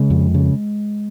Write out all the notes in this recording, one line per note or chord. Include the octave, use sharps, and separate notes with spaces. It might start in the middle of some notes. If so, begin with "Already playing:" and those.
Already playing: C#3 G#3
F2
C#3